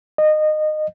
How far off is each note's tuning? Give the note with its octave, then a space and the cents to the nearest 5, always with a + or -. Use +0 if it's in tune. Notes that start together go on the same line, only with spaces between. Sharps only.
D#5 -20